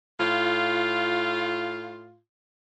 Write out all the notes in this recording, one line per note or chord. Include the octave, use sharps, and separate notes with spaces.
A2 F4